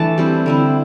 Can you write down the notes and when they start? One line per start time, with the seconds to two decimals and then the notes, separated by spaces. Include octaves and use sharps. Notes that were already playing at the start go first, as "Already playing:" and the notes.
Already playing: E3 A3 D4 A5
0.18 G3 C4 E4
0.46 D3 C4 E4